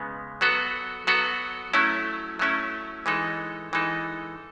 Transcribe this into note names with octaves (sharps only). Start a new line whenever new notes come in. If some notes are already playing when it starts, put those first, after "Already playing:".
Already playing: C#3 G#3 B3
F#3 B3 F#4 A4
F#3 B3 F#4 A4
F#3 A3 C#4 E4
F#3 A3 C#4 E4
E3 G#3 D#4 A4
E3 G#3 D#4 A4